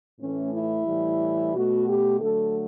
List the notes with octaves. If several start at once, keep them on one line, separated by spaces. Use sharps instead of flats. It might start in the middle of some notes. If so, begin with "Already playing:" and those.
A2 E3 A3 C#4
E4
A2 E3 G3
B2 A3 F#4
G4
D3 F#3 A3 A4